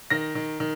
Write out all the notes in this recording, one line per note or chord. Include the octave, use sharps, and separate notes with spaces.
D#3 A#6
D#3
D#3